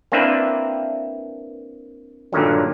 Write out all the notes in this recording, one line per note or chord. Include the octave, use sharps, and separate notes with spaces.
A#3 C4 D4 E4 B4 E5
G2 A#2 D3 D#3 F#3